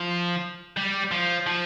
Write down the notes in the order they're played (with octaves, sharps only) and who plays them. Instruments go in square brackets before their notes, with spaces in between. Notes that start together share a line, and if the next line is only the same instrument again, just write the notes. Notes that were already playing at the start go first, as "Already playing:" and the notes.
Already playing: [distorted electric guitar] F3
G3
F3
F3